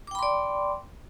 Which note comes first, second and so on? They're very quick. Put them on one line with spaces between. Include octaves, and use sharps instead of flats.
D6 G5 B5 C6 D5